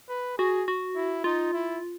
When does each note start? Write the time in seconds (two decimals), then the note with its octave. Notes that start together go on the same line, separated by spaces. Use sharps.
0.09 B4
0.38 F#4 G#4
0.68 F#4
0.95 E4
1.24 D#4 F4
1.53 E4